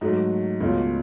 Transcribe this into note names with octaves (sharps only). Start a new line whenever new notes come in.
G#2 F#3 A3
C#2 B2 A3 C#4 F4